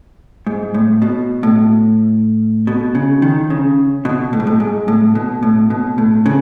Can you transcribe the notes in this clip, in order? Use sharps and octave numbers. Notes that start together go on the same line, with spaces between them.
G#2
A2
B2
A2
B2
C#3
D#3
C#3
B2
A2
G#2
A2
G#2
A2
B2
A2
B2
A2
C#3